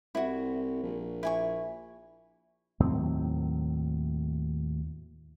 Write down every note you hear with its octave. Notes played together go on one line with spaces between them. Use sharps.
C2 E4 F#4
A#1
E4 G#5 C#6
D#2 A2 F#3 C4